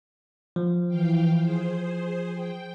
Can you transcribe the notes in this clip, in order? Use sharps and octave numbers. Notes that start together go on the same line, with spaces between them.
F3
E3 F5 G5
G#4 C5
G5